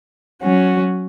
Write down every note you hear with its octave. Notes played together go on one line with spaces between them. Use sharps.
F#3 C#4 F#4